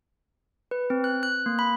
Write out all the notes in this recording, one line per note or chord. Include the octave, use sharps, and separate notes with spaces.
B4
C4
F#6
F#6
A#3
B5